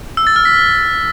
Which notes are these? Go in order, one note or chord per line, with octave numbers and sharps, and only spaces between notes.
E6
A6
F6
B6